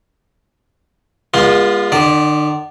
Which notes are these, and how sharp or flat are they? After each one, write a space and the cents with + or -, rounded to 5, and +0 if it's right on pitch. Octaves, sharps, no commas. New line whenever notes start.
G#3 -30 B3 -40 F4 +0
D3 +45 D5 -10